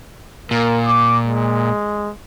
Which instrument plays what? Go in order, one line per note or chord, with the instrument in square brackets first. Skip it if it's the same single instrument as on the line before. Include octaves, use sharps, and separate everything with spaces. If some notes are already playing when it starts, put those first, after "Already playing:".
[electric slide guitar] A#2 [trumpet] A#4
[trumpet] D6
G#3